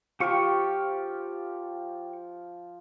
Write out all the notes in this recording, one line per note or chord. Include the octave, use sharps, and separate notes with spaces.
F3 G4 F5 G5 C#6